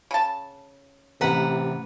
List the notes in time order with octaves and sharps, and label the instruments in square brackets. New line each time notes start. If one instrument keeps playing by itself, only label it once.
[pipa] C#3 A5
[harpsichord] A1 [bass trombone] C3 [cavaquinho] B4 F#5 A#5